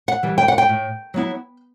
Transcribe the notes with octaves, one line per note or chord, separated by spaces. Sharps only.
F#5
E3 G3
G5
F#5
G5
A2
F#3 B3 E4